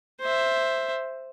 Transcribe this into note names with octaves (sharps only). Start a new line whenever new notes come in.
C5 E5